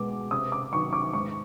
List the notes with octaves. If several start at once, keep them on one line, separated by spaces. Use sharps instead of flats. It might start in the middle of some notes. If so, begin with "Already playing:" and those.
Already playing: B2 G#3 B3 D6
C3 D#6
D6
D#3 F#3 B3 C#6
D6
G#2 C#6